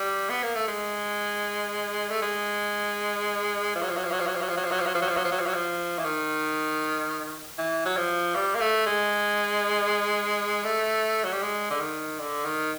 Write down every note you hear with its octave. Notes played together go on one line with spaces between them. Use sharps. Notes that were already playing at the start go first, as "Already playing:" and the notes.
Already playing: G3
B3
A#3
A3
G#3
A3
G#3
F3
F#3
F3
F#3
F3
F#3
F3
F#3
F3
F#3
F3
F#3
F3
F#3
F3
F#3
F3
F#3
F3
F#3
F3
F#3
F3
F#3
F3
E3
D#3
E3
F#3
F3
G3
A#3
A3
G#3
A3
F#3
G3
G#3
D3
D#3
D3
D#3